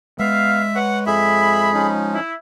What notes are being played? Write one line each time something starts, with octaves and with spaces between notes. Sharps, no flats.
G#3 B3 E5 F5
B4 C#5 F#5
F2 G#4 E5 B5
F3 C#4 D#4
E4